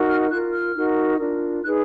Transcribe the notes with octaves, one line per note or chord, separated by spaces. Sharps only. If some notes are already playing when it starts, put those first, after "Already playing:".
Already playing: D#4 F#4 A#4
F6
F4 A#4 F#6
F6
D#4 F#4 A#4
D4 F4 A#4
D#4 G#4 B4 F#6